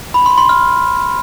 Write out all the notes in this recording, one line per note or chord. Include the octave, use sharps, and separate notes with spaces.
B5
C6
C6
F6